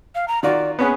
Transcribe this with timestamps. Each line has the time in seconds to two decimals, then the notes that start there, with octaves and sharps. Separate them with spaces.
0.15 F5
0.28 A#5
0.43 D#3 F4 F#4 D5
0.79 B3 C#4 G#4 B4